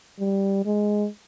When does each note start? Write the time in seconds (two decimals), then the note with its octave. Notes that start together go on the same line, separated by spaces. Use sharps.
0.19 G3
0.65 G#3